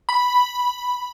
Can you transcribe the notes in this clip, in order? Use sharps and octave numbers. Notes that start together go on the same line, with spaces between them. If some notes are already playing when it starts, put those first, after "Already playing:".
B5